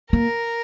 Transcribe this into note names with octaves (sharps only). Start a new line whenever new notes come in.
A#3 A#4